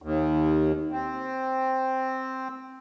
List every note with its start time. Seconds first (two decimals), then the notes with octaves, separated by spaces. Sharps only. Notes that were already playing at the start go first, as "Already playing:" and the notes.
0.02 D#2
0.92 C4